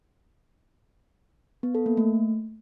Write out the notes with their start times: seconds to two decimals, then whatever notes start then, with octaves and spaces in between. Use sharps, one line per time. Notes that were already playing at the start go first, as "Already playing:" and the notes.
1.63 B3
1.75 A4
1.86 A#3
1.97 A3